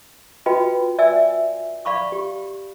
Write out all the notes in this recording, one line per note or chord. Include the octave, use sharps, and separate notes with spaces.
F4 F#4 B4 D#5 G5 B5
D5 E5 G#5 E6
D5 F5 B5 C#6 D6
G4